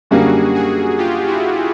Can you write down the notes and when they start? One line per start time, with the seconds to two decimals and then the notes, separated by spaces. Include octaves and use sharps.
0.11 F#2 D3 G3 A#3 F#4 G#4
0.55 F#4 G#4
0.98 F4 G4
1.27 E4 F#4